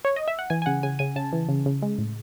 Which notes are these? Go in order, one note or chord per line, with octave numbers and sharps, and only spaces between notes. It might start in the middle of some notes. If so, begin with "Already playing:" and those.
C#5
D#5
E5
F#5
E3 G#5
G#5
C#3 F#5
C#3 G#5
C#3 G#5
C#3 A5
E3
C#3
C#3
G#3
A2